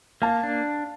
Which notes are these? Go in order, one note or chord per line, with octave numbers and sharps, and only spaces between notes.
A#3 F5 A5
D4